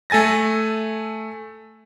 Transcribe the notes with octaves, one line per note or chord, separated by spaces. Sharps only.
A3 A4 G#5 A6 A#6